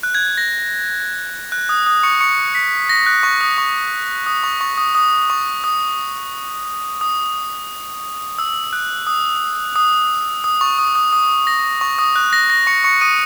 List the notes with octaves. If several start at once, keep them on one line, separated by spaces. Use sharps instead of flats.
F#6
G#6
A#6
F#6
D#6
D#6
C#6 C#7
C#6 C#7
B6
A#6
F#6
C#6
D#6
C#6
D#6
C#6
C#6
D#6
D#6
C#6
D#6
D#6
E6
F#6
D#6
D#6
D#6
C#6
D#6
D#6
D#6
A#6
C#6
D#6
F#6
A#6
A#6
C#6 C#7
C#6 C#7
D#6 D#7